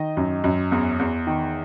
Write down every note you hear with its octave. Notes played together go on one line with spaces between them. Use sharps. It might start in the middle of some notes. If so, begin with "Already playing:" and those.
Already playing: D#3 D#5
F#2
F#2
E2
E2
D#3